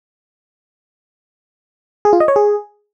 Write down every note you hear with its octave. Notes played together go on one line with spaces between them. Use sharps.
G#4
F4
D#5
C#5
G#4